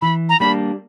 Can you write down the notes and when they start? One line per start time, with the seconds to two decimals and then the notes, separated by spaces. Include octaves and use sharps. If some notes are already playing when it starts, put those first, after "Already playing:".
0.02 E3 B5
0.29 A#5
0.40 G3 A#3 D4 B5